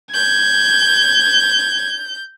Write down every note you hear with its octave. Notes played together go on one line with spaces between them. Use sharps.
G6 G#6